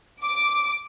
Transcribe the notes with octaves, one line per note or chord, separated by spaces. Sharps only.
D6